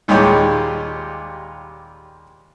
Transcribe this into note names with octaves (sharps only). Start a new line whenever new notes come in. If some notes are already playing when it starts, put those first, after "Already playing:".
D#2 A#2 G3 G#3 G4 C#5